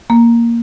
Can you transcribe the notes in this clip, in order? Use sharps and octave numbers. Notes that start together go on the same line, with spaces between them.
A#3